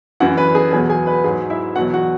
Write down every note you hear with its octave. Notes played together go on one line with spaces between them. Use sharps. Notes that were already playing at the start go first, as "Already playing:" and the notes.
F#2 E3 F#4 F#5
B4 B5
G#4 G#5
E2 B2 F#3 G#4 G#5
G#4 G#5
B4 B5
G#2 F#3 G#4 G#5
E4 E5
E2 B2 F#3 F#4 F#5
F#4 F#5